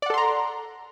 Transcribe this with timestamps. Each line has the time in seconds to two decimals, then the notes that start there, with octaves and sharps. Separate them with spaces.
0.02 D5
0.06 F#5
0.10 A4
0.14 C6
0.18 A#5